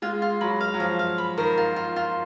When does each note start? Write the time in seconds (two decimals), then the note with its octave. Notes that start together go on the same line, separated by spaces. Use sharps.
0.02 G#3 F4
0.22 F4
0.41 F#3 B5
0.61 F5
0.74 F#3
0.80 F3 F5
0.99 F5
1.18 B5
1.38 D#3 A#4
1.58 F4
1.76 F4
1.96 F4